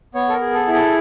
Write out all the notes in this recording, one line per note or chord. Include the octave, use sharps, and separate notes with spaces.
B3 C#5
A4
A#4
G#4
A4
E4
A4